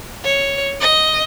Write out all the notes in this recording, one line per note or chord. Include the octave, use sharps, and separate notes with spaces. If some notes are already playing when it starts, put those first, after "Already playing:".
C#5
D#5